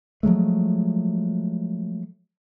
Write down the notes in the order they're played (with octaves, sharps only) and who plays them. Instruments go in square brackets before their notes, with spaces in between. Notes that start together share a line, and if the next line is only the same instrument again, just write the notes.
[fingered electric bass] F3 F#3 G#3 A3